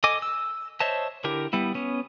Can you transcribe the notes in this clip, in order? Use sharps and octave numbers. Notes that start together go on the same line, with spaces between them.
A4 D#5 G#5 D6
E6
C5 C#5 D#5 E5 A5
D3 E4 G4 A#4
G3 B3 E4
B3 C#4